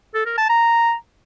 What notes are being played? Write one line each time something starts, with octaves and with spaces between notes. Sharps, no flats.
A4
A#4
A5
A#5